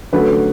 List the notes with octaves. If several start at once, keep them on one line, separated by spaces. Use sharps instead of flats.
D3 F#3 A3 C#4 B4